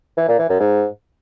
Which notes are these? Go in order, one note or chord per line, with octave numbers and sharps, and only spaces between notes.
E3
A#2
E3
F#2
G#2